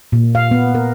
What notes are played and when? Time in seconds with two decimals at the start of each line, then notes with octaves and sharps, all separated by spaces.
0.12 A#2
0.35 F5
0.51 B3
0.75 A#4